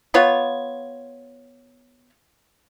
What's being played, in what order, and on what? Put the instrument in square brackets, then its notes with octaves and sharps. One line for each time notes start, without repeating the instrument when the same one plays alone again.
[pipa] B3 F4 C#5